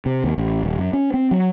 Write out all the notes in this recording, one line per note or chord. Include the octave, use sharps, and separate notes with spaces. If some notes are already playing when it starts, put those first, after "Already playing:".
C3
D#2
A1
D#1
F#2
C#4
C4
F#3